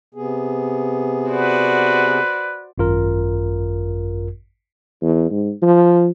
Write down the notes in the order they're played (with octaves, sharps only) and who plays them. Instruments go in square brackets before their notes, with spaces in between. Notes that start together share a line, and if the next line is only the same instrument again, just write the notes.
[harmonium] C3 B3 G#4
[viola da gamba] F#4 C5 D5 [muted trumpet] B4
[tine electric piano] G#1 F#2 F4 A#4
[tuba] E2
G#2
F3